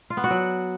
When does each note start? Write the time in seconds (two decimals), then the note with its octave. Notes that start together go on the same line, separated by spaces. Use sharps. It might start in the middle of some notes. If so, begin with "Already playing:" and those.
0.10 F4
0.17 B3
0.24 F#4
0.31 F#3